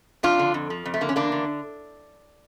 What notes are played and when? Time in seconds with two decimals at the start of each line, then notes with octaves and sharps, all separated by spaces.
0.23 F2 D4 F4
0.39 D3
0.54 F2
0.70 F3
0.85 F2
0.94 A3
1.01 D3 A#3
1.09 C#4
1.16 E2 A#3 D4
1.32 D3